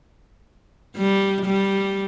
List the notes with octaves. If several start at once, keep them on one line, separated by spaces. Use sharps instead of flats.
G3
G3